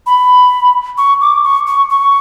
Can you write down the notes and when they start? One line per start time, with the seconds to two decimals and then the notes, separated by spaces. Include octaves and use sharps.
0.06 B5
0.98 C#6
1.21 D6
1.43 C#6
1.67 C#6
1.90 C#6